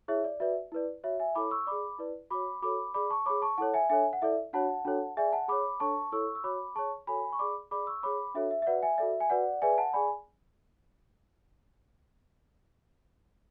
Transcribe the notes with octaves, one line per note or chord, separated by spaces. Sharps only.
E4 G#4 C#5 E5
D5
F#4 B4 D5 E5
E4 B4 D5
F#4 C#5 E5
E5 G#5
E4 A4 C#5 B5 D6
C#6 E6
G#4 D5 B5 D6
E4 B4 D5
F#4 C#5 B5 D6
F#4 A4 C#5 B5 D6
G#4 D5 B5 D6
A5 C#6
G#4 C#5 B5 D6
A5 C#6
E4 A4 C#5 F#5 A5
E5 G#5
D4 A4 C#5 E5 G#5
F#5
E4 A4 D5 E5
D4 F#4 C#5 F#5 A5
D4 F#4 A4 C#5
G#4 D5 E5 G#5
F#5 A5
G#4 C#5 B5 D6
D4 A4 C#5 A5 C#6
E4 A4 C#5 C#6 E6
E6
F#4 C#5 B5 D6
G#4 C#5 A5 C#6
F#4 A4 C#5 G#5 B5
C#6
G#4 D5 B5 D6
G#4 D5 B5 D6
C#6 E6
G#4 C#5 B5 D6
D4 F#4 A4 C#5 E5
E5
E5
F#4 B4 D5 F#5
E5 G#5
F#4 A4 D5 E5
G#5
F#4 B4 D5 F#5
G#4 B4 D5 E5 G#5
F#5 A5
G#4 D5 G#5 B5